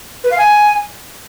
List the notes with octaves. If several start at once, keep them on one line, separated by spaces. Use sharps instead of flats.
B4
F5
G#5